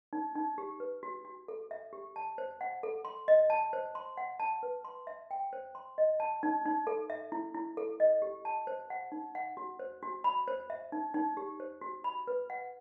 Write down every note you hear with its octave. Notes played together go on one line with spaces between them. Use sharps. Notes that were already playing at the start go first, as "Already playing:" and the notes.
D#4
D#4
G4
B4
F#4
F#4
A4
E5
G4
A5
C5
F#5
A4
C6
D#5
A5
C5
C6
F#5
A5
B4
C6
E5
G5
C5
C6
D#5
A5
D#4
D#4
A4
E5
E4
E4
A4
D#5
G4
A5
C5
F#5
D#4
F#5
F#4
C5
F#4
B5
C5
E5
D#4
D#4
G4
C5
F#4
B5
B4
F#5